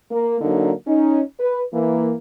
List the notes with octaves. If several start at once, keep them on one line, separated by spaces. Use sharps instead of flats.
A#3
D3 F#3 A#3 D4 D#4
C#4 D#4
B4
E3 A#3